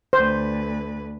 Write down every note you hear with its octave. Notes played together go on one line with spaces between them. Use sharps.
D2 B4 C5